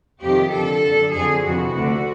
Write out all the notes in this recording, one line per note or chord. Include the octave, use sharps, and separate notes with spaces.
F2 C3 D#3 G4
F2 D3 A4
F#2 D3
F2 D3 G#4
F2 C3 E3 F#4
D2 D3